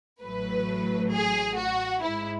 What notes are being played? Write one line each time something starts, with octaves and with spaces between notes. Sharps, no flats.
A1 A2 F#3 A3 B4
G#4
F#4
G#2 G#3 E4